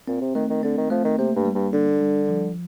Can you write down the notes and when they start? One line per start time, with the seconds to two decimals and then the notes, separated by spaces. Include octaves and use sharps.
0.08 A#2 C4
0.21 C3
0.35 D#3 A3
0.50 D#3
0.63 D3 C4
0.77 D#3
0.90 F3 A3
1.05 D#3
1.18 C3 A#3
1.36 G2
1.45 G3
1.55 G2
1.73 D3 D4
2.01 G3
2.29 F3